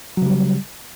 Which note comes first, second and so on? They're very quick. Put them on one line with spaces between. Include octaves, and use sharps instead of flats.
F#3 C#3 G3